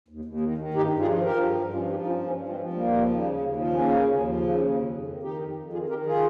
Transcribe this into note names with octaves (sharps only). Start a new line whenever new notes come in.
D#2
D#2
D#3
D#3
G2 D#4 G4
G2
F4 G#4
F3
F3 G4 A#4
G2
G2
F3 C#4 F4
F3 D#4 G4
D#4
G2 C#4 F4
G2 A#3 C#4
F3
G#3 C4
F3
D#2 G3 A#3
F3
C#3
D#2
D#2
F3
C#3 A#3 C#4
D#2
D#2
F3
C#3
D#2
F2
F2
D#3
D#3 D#4 G4
F2
F2
D#3 F4 G#4
D#3 G4 A#4
F4 G#4